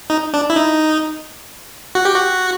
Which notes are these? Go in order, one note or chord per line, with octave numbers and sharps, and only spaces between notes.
D#4
D4
E4
D#4
F#4
G4
F#4